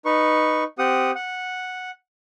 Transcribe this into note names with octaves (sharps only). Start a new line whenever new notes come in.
D#4 B4 C#6
C4 G4 F#5 D#6
F#5